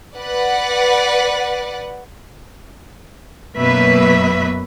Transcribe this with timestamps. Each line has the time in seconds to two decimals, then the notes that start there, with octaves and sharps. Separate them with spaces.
0.15 B4 D5 F#5
3.57 F#2 B2 F#3 A#3 B4 E5